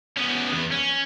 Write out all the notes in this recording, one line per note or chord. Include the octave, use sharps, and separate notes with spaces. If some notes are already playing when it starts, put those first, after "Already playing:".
B3 C#4
E2 B3
C#4